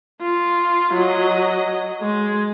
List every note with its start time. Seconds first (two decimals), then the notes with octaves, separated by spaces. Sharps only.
0.21 F4
0.94 F#3 D#5
2.01 G#3